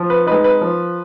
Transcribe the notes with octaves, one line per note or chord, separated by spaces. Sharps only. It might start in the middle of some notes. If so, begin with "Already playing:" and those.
Already playing: F3
B4
G#3 D#4 B4
B4
F3